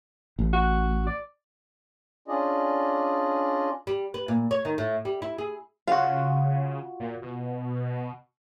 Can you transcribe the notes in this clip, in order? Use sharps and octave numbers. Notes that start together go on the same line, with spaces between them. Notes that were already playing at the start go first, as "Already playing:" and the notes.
A1
F#4
D5
C#4 D4 F4 G#4 D5 D#5
G3
B4
A#2
C#5
D#3
A2
G3
E4
G#4
C#3 F4 F#4 F5
A#2
B2